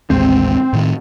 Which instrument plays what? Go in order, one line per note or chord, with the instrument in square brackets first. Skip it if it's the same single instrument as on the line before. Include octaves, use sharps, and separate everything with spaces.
[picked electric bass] A1 D#2 G#3 [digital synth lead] C4
[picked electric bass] A2 D#3